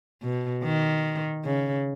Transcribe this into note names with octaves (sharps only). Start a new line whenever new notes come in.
B2
D#3
C#3